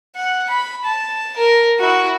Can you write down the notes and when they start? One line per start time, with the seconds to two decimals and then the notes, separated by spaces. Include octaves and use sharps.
0.16 F#5
0.50 B5
0.84 A5
1.37 A#4
1.80 E4 F#4